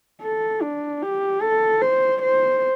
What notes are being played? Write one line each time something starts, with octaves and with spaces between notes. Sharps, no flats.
A4
D4
G4
A4
C5
C5